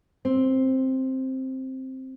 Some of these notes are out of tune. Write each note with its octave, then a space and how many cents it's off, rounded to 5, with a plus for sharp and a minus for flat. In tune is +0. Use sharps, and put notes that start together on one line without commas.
C4 +5